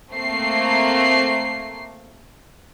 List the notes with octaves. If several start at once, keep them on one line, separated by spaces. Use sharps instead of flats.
A3 A#3 C4 C7